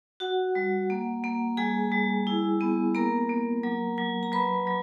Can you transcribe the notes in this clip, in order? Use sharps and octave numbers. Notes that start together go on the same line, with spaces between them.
F#4 F#5
G3
A#3
A#3
G3 G#4 G#5
G3
E4
B3
A#3 A#4 A#5
A#3
F#3
F#3
A#5
F#3 B4 B5
F#3